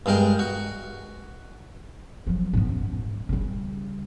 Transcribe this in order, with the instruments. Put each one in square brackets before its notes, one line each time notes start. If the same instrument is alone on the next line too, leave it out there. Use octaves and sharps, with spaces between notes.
[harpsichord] G2 G#3 A#4 G5
F#4
[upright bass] F3 F#3
G#2 B3
F#2
G#2
C#3 G3